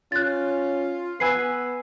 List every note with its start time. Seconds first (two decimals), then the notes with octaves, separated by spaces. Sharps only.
0.12 C#4 F4 F#6 A6
1.20 B3 B4 G#5 E6 C7